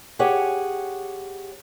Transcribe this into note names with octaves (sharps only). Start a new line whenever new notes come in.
G4 G#4 C#5 F#5